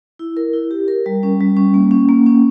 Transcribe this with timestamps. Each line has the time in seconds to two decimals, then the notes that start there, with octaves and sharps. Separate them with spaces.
0.19 E4
0.37 A#4
0.53 E4
0.71 G4
0.88 A#4
1.06 G3
1.23 C#4
1.40 G3
1.57 C#4
1.74 A#3
1.91 C#4
2.09 A#3
2.26 C#4